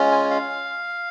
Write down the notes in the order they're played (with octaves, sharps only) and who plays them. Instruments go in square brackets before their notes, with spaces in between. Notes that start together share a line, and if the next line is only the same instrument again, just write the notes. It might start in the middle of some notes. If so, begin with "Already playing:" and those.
Already playing: [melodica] G#3 C#4 F4
G#5
F5